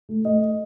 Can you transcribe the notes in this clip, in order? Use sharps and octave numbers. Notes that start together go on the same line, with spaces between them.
A3
A3 D#5